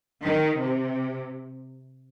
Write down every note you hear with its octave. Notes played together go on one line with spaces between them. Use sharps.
D#3
C3